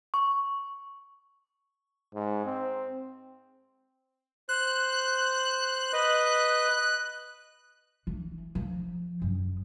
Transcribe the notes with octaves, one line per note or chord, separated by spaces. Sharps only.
C#6
G#2
C4
C5 F#6
B4 D#5
E3
F3
F#2